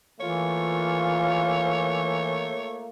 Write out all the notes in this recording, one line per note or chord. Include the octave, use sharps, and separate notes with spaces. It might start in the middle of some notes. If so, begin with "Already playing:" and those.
E3 A3 A#3 F4 C#5